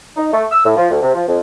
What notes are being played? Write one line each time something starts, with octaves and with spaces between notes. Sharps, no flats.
D#4
A3
E6
A2
F3
D2
C3
F3
F2